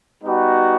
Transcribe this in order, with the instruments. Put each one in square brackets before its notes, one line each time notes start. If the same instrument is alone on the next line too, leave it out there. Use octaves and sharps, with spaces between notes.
[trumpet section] G3 B3 D#4 F#4